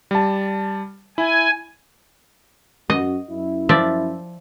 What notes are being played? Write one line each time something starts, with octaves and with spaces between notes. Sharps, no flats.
G3 A5
E4 G#5
F#2 F#4 D#5
F#2 E4
F3 D5 E5